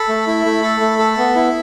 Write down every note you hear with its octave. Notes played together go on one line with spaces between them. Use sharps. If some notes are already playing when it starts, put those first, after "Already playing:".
Already playing: A4 B5
A3
E4
A3
A4
A3
A4
B3
E4